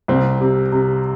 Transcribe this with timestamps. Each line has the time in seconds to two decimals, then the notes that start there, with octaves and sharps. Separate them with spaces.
0.08 C2 C4
0.41 C3
0.72 C3